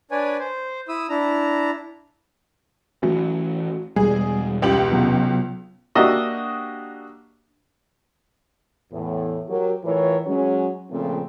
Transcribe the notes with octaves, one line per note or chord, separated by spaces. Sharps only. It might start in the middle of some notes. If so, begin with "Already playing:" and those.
D4 B4 C#5 D5 G#5
C5
E4 D#6 E6
D4 E4 A#5
E3 F#3 A3 C#4
E2 B2 G3 G#3 G#4
C#2 G4 F#7
C3 F#3 B3
A#3 D4 F#4 G4 D#5 E5
E2 A2
F#3 G4 A#4
A2 E3 F4 A#4 C#5
F#3 G#3 C#4
A#2 C#3 F3 A3 C4